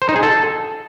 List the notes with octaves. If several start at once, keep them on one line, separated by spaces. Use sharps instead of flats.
C5
D#4
G#4
A4